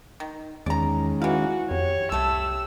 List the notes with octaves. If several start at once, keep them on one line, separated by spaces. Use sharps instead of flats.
D#3
E2 D#3 G#3 C#4 D5 A#5
E3 E4 F#4 F5
F2 G4 C#5
C2 A3 A4 E6